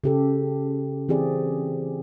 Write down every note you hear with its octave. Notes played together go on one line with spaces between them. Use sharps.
C#3 G4 A4
E3 C4 G4 G#4 D5